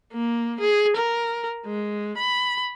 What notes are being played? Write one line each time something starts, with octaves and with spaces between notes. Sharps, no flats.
A#3
G#4
A#4
G#3
B5